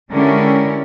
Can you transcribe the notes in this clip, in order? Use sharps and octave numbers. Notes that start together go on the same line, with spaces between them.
D3 G#3 C#4 E4 G4 A#4